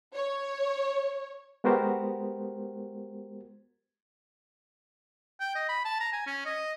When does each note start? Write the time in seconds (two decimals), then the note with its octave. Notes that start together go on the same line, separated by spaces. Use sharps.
0.15 C#5
1.64 G#3 B3 F#4 G4 A#4 C5
5.40 G5
5.55 D#5
5.69 B5
5.85 A5
6.00 A#5
6.12 G#5
6.27 C#4
6.45 D#5